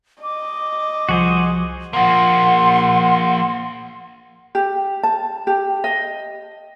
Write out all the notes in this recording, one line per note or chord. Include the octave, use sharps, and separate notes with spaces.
D#5 D6
C2 F3 F#4 G#4 C5 D#6
F3 A#3 F#5 C6
G4
A5
G4
D#5